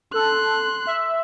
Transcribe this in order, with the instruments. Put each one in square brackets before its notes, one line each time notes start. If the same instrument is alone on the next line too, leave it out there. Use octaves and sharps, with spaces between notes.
[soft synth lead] A4 [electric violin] C6 F#6
[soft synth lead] E5